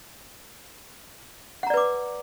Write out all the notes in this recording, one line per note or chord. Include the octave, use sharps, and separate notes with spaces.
B4 D5 F#5 A#5 D6